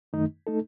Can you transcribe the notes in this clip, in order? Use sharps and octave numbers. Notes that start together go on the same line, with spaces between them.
F#2 D#3 A3 D#4
A3 D#4 A4